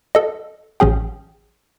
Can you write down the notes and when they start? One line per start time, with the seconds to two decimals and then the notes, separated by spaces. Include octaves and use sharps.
0.15 A4 D#5
0.80 A1 C#4 G#4 G5